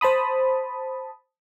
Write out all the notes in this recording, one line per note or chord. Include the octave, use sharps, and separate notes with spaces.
C5 A5 B5 D#6